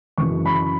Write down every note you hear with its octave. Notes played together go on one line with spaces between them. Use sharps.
F#2 C#3 E3 C#6
B5